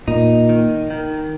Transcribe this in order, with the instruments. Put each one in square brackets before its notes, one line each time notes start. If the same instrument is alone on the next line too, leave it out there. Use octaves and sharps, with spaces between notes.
[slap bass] A#2 [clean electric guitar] D#4
[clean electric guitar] D#3
D#3